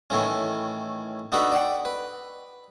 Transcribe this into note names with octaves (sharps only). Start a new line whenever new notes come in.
A2 D#3 E3 A3 C#4
D4 D#4 F#4 A4 B4
D5 F#5 G5
B4